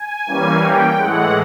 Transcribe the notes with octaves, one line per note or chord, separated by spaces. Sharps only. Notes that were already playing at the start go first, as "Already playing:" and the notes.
Already playing: G#5
E3 G3 A#3 C#4
G5
A2 E3 G#3 F#5